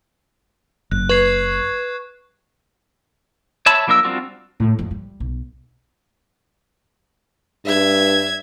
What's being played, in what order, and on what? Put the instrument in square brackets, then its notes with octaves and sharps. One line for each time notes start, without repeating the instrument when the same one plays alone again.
[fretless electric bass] F#1 [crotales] F#6
[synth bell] B4 [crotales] C#6 G#6 C7
[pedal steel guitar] C#5 E5 A5 B5
F3 A#3 D4 A#4 E6
G3 C4 D4 F4 F#4
[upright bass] A2
F2 G#2
G3
B1
[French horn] G2 [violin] E5 G#6